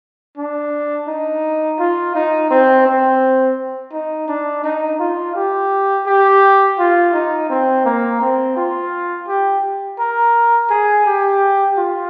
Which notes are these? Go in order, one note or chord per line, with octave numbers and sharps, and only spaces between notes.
D4
D#4
F4
D#4
C4
C4
D#4
D4
D#4
F4
G4
G4
F4
D#4
C4
A#3
C4
F4
G4
A#4
G#4
G4
F4